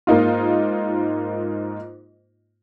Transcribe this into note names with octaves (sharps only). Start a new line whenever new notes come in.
G#2 A#3 D#4 F4